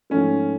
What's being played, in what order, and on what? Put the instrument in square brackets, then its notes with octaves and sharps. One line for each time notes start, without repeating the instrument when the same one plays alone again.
[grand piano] G#2 F3 A3 [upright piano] C#4